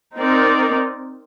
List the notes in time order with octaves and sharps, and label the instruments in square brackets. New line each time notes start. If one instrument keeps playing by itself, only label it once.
[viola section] C4 D#4 A#4 D5